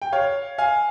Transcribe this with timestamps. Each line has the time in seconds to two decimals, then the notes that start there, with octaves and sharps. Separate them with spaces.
0.02 G5
0.12 C#5 F5
0.58 F5 G#5